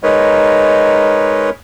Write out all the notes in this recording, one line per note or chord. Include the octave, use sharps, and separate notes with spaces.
G#3 D#4 A#4 B4 C#5